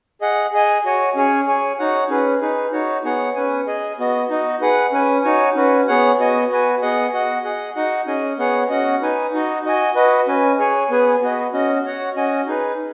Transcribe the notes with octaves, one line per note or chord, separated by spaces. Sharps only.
G#4 D#5 F#5
G#4 D#5 G#5
F#4 C#5 G#5
C#4 G#4 C#5 G#5
G#4 C#5 G#5
D#4 F#4 C#5 F#5
C#4 G#4 B4
D#4 G#4 B4
D#4 F#4 C#5
B3 G#4 C#5 F#5
C#4 B4 G#5
G#4 D#5 G#5
B3 F#4 D#5
D#4 F#4 D#5
G#4 B4 F#5
C#4 B4 G#5
D#4 F#4 C#5 G#5
C#4 F#4 B4
B3 G#4 C#5 F#5
B3 F#4 D#5 G#5
F#4 B4 G#5
B3 G#4 D#5 F#5
F#4 D#5 F#5
G#4 D#5 F#5
D#4 F#4 D#5 F#5
C#4 G#4 D#5 G#5
B3 G#4 C#5 F#5
C#4 F#4 D#5 F#5
D#4 B4 G#5
D#4 F#4 D#5
F#4 D#5 G#5
F#4 B4 D#5
C#4 B4 G#5
G#4 C#5 G#5
B3 G#4 B4 G#5
B3 F#4 B4 D#5
C#4 F#4 D#5
F#4 C#5 F#5
C#4 F#4 D#5 G#5
D#4 G#4 B4